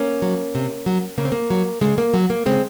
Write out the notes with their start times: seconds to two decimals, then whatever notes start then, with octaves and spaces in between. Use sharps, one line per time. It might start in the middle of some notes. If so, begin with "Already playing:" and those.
Already playing: A#3 C#4
0.22 F#3
0.55 C3
0.86 F#3
1.18 C#3 A#3
1.25 C4
1.32 A#3
1.50 F#3
1.81 C#3 G#3
1.98 A#3
2.14 F#3
2.30 A#3
2.46 C#3 G#3 C4